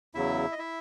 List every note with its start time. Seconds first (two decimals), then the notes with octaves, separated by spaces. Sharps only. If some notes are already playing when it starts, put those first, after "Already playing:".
0.15 E2 C#3 F#3 E4 E5
0.52 D#5
0.59 E4 E5